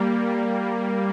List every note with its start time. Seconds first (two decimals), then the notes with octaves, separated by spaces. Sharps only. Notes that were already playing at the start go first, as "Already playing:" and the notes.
Already playing: G3 A#3
0.27 G3